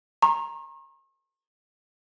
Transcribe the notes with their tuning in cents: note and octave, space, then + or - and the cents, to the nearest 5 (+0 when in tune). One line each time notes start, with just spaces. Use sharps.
A#5 +0 C#6 -45